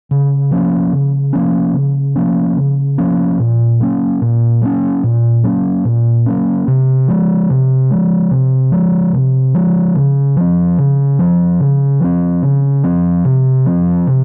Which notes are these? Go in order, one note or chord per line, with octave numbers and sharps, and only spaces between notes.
C#3
F3 A#3 C#4
C#3
F3 A#3 C#4
C#3
F3 A#3 C#4
C#3
F3 A#3 C#4
A#2
F#3 A#3 C#4
A#2
F#3 A#3 C#4
A#2
F#3 A#3 C#4
A#2
F#3 A#3 C#4
C3
F3 G#3
C3
F3 G#3
C3
F3 G#3
C3
F3 G#3
C#3
F3 C4
C#3
F3 C4
C#3
F3 C4
C#3
F3 C4
C3
F3 C4
C3